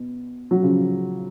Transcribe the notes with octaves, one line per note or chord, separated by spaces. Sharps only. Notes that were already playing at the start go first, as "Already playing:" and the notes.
Already playing: B2
F#3
C#3 F3